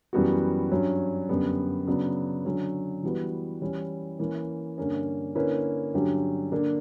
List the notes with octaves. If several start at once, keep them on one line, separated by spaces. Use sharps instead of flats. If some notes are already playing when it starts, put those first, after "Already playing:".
F#2 E3 G3 B3 F#4
G2 F#3 C#4
F#2 D3 G3 B3
C#3 F#3 B3 D4
D3 F#3 C#4
E3 G3 B3 F#4 B4
E3 G3 C#4 E4
E3 A#3 C#4
G2 D3 A#3 C#4
D3 A#3 C#4 E4 B4
G2 D3 F#3 C#4 G4
D3 A#3 D4